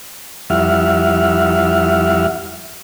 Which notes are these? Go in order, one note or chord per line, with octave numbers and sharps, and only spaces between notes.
F2 G3 E4 E5 F#5 F6